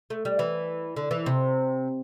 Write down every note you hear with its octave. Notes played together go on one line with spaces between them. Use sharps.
A3
G3
E3
D3
E3
C3